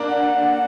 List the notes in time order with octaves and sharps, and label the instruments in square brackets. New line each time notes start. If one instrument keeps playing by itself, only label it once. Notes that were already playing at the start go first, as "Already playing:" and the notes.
Already playing: [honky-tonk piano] A#3 D4
[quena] F#5